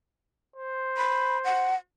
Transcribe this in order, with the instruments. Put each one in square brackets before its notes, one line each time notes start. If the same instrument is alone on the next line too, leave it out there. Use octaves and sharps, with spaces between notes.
[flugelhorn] C5
[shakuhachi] B5
F#5